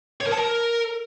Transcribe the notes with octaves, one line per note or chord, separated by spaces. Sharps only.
C#5
A#4
A5
A#4